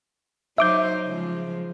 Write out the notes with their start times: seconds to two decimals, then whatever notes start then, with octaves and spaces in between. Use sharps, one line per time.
0.58 F#3 D#4 C5 E5 D6 G6
1.06 C#3 F3 G#3